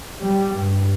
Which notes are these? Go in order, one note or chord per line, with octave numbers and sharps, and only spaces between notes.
G3
G2